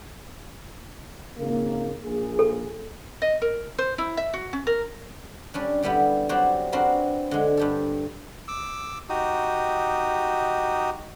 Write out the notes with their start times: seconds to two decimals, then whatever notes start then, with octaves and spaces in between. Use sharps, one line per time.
1.38 G#1 C#3 A#3
2.04 A#1 A#3 G#4
2.39 A4
3.22 D#5
3.42 A#4
3.78 C5
3.98 E4
4.17 E5
4.34 F#4
4.53 C#4
4.67 A#4
5.54 G3 C#4 D4
5.83 D3 G3 B3 E4 G4
6.29 F#3 G3 C4 F#4 G4
6.72 C4 D4 F#4 A#4 B4
7.31 D3 G#3
7.57 G2 G4 A4
8.48 D6 E6
9.09 D#4 F#4 G4 D#6